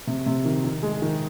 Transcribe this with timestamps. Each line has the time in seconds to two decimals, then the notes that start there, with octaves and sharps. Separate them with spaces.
0.07 C3
0.26 C3
0.45 D#3
0.64 D#3
0.83 G#3
1.02 D#3